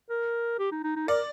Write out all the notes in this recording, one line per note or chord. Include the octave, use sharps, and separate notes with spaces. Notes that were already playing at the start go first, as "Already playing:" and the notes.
A#4
G4
D#4
D#4
D#4
A#4 D5